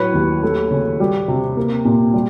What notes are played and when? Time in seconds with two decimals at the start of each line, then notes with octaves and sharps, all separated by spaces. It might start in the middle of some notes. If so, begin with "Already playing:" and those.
Already playing: A2 F#3 B4 C#5
0.14 D#2
0.43 A3
0.71 C#3
1.00 G3
1.28 C3
1.57 A#3
1.85 A#2
2.14 G3